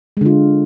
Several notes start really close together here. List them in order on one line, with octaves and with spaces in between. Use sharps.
G#3 D3 F4